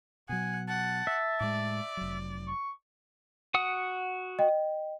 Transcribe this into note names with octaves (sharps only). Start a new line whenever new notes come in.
B2 F#3 F#5 G#5
F#5 A5
E5
A2 G#3 D5
F1 F#3
C#6
F#4 F#5 D#6
D#5 G5